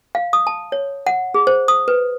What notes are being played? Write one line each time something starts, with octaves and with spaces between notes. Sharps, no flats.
F5
D#6
A5
C#5
F#5
G#4
C5
D#6
B4